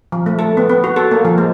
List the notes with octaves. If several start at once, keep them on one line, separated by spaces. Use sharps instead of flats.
F3
A3
A4
B3
B3
F#4
A4
A#3
F3
G#3